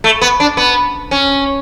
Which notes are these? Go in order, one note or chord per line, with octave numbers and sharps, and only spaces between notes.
A3
B3
D4
B3
C#4